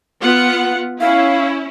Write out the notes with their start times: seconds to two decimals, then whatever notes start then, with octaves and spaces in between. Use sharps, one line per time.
0.22 B3 F4 F#5
1.00 C#4 E4 F5